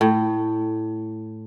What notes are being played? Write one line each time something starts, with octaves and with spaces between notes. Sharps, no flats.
A2